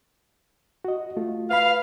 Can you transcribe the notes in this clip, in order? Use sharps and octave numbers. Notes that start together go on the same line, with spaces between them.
F#4 D#5
A3 F4
B4 F5 B5